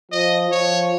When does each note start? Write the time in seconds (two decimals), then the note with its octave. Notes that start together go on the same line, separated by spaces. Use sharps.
0.12 F3 D#5
0.51 F3 C#5